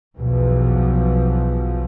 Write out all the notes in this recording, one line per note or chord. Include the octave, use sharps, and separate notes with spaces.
B1 E2 B2 E3 F3